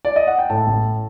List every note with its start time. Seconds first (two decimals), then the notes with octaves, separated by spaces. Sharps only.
0.05 D5
0.16 D#5
0.27 F#5
0.39 G5
0.50 A2 A4 A5
0.67 A1